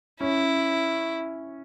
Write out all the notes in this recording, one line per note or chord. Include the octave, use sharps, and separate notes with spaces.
C#4 E4